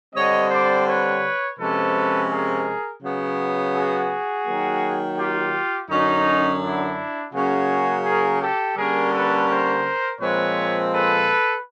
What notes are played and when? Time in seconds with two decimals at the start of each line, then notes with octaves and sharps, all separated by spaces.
0.13 D3 G3 C4 C#5 D#5
0.49 C5 D5
0.86 B4 C#5
1.57 C3 F3 G#3 C#4 A4 B4
2.29 G#4 A#4
3.01 C#3 F#3 B3
3.73 F#4 G#4
4.46 D#3 F#3 A#3
5.17 F4 G4
5.89 F#2 D3 F#3 C#4 D#4
6.61 D4 E4
7.32 C#3 F#3 A#3 C#4 F#4 G#4
8.04 G#4 A#4
8.40 G4 A4
8.76 D3 G3 A#3 C#4 G#4 A#4
9.12 A4 B4
9.48 A#4 C5
10.19 A#2 F3 G#3 C4 B4 C#5
10.91 A4 B4